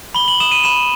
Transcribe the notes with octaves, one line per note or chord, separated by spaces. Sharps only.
B5 G7
F#7
D#6 E7
D#7
B5 E7